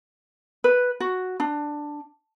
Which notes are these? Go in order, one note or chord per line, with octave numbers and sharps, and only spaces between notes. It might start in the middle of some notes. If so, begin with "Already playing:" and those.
B4
F#4
D4